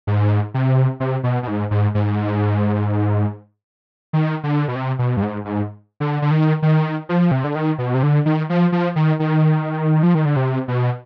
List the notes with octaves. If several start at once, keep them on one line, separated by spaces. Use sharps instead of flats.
G#2
C3
C3
B2
B2
G#2
G#2
G#2
D#3
D3
B2
C3
B2
G2
G#2
G#2
D3
D3
D#3
D#3
F3
C3
D3
D#3
B2
C3
D3
D#3
F3
F3
D#3
D#3
F3
D#3
D3
C3
B2